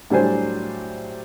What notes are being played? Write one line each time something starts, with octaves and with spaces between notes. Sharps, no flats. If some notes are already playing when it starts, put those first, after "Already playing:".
A2 F#3 G3 D4 C5 G#5